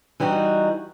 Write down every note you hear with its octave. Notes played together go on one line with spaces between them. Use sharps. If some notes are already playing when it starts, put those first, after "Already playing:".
E3 G3 D#4 F#4